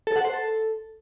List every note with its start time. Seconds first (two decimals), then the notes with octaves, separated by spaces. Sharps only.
0.07 A4
0.16 F#5
0.25 C5
0.33 A4